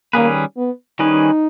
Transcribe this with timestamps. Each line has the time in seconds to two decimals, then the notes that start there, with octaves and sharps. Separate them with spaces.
0.13 D#3 G3 A#3 C#4 G#4 B4
0.57 B3
0.99 D#3 G3 C#4 D#4 G#4 B4